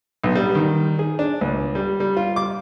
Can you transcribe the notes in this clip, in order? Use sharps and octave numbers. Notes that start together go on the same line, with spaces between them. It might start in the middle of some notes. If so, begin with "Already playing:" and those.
B1
G3
D#3
G#4
D4
C#2
G3
G3
F4
D6